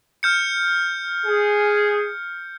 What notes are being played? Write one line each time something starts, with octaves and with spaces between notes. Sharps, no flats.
F6 G6 C#7
G#4